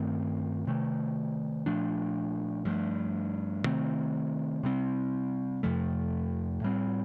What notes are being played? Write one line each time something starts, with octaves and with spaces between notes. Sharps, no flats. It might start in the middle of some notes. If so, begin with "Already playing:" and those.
Already playing: G2 D#3 A3 C4
C3 D#3 A3
A#2 F3 A3 D4
G2 F3 A3
C3 D#3 A3 C4
C3 G3 C4
F2 C3 F3 A3
A2 G3 C4